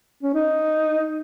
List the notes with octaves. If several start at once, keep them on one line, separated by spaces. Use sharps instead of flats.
C#4
D#4